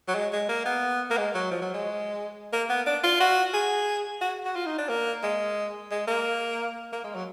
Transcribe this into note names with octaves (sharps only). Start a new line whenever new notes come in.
F#3
G#3
G#3
A#3
B3
A#3
G#3
F#3
F3
F#3
G#3
A#3
B3
D4
F4
F#4
G#4
F#4
F#4
F4
D#4
D4
A#3
G#3
G#3
A#3
A#3
G#3
F#3